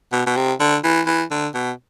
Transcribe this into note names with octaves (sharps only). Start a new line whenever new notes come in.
B2
B2
C3
D3
E3
E3
D3
B2